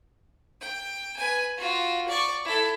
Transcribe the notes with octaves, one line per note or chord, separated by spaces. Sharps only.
G5
B4 G#5
F4 F#4
D5 C#6
E4 A4